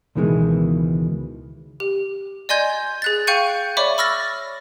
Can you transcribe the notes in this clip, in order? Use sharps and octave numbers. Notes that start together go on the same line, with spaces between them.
C#2 B2 D#3 E3 G#3
G4
D5 D#5 G#5 C6 G6 G#6
G#4 F#6 A6
F5 G5 C#6 G6 C#7 D#7
C#5 D5 E5 B5 C#6 D6
B5 C#6 E6 F6 A6 A#6